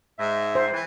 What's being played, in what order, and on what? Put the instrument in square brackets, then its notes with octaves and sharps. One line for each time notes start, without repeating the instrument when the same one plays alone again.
[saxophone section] G#2 E5
[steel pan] C5
[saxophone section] E3